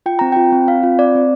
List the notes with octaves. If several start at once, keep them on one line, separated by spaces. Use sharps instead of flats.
F4 G5
C4 A#5
F4 G5
C4
C4 F5
F4
C4 D5
C4